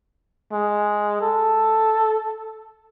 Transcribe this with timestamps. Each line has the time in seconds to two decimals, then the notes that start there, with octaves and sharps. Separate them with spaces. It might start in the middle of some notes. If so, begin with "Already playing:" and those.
0.52 G#3
1.21 A4